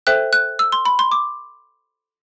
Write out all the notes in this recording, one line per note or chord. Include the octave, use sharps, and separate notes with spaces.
A4 C5 E5 G5 F#6
F#6
E6
C6
B5
C6
D6